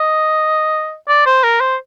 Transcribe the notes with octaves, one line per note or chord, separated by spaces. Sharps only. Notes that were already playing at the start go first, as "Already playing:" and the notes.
Already playing: D#5
D5
C5
A#4
C5